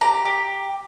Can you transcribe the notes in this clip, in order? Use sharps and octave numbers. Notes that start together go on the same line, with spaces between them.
G4 A#5
G4